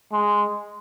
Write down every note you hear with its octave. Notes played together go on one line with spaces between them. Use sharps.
G#3